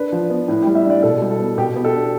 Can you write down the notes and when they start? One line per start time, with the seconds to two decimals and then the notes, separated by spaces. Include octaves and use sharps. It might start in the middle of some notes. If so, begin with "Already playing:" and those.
Already playing: D4 B4
0.12 F3
0.30 B3
0.48 A2
0.62 G4
0.67 G3
0.75 E5
0.85 D4 D5
1.02 B2 A4
1.22 G3
1.31 A4
1.39 B3
1.57 B2 G4
1.76 B3
1.84 A4
1.94 D4